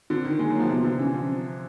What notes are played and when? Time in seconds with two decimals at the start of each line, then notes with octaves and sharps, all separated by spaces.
0.10 D3 C4
0.25 D#3
0.39 G#3 A#3
0.50 F#3
0.60 F3
0.69 C3 B3
0.84 D3
0.99 E3 C#4
1.14 F3
1.29 C4